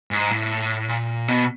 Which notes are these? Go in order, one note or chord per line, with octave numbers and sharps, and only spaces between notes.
G#2
A2
A#2
B2